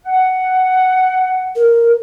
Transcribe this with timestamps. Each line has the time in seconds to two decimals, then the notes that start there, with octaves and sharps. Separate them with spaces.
0.04 F#5
1.55 A#4